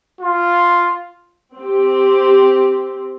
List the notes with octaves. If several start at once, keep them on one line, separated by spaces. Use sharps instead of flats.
F4
C4 G4